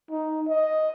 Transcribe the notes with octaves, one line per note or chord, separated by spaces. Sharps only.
D#4
D#5